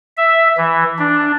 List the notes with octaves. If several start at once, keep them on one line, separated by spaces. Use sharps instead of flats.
E5
E3
D4